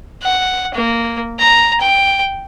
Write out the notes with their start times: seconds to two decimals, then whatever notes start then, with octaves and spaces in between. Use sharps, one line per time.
0.22 F#5
0.75 A#3
1.39 A#5
1.81 G5